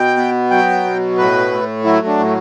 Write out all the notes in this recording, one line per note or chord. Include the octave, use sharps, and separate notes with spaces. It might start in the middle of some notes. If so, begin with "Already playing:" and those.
Already playing: B2 G5
B3
F#3 G5
B2
A2 B4
A3
F#3 E4
D4
A2